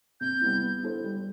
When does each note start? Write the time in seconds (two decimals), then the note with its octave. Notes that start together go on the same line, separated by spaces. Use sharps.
0.21 C3 G6
0.41 G3 B3 E4
0.62 B3
0.83 E4 A4 C5
1.04 G3